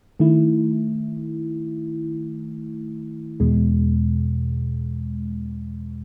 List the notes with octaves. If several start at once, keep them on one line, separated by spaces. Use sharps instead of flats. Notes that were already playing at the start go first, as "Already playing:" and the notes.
D#3 A3 E4
E2 B2 G#3